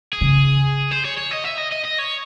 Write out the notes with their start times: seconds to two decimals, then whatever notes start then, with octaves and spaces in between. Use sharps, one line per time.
0.13 G#4
0.21 C#3
0.91 C5
1.05 C#5
1.18 C#5
1.31 D#5
1.44 E5
1.58 D#5
1.71 D#5
1.84 D#5
1.98 C#5